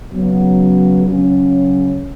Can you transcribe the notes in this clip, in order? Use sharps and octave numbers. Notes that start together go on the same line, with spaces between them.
C#3 F#3 B3
C#3 F#3 C#4